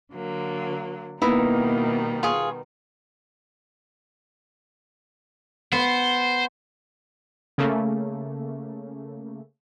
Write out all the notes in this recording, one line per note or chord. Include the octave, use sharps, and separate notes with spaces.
D3 F#3 A#3
B2 D#3 G3 A#3 B3 D#4 E4
F4 G#4 C#5
B3 C5
C#3 A3 A#3